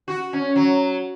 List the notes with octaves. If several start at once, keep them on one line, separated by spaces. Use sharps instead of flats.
F#4
C#4
F#3